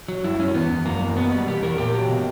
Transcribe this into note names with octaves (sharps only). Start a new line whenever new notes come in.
F#3
G2 E4
G2 C#4
E2 B3
E2
F#2 A#3
F#2
B2 B3
G3
E2 G4
E2 A#4
A#2 G4
F#3
B2